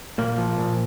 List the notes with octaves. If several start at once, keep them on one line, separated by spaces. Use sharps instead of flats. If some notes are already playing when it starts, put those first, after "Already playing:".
A#2 A#3
F3
A#2